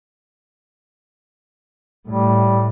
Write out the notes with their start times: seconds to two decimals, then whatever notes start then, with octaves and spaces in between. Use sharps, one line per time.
2.08 A2 G3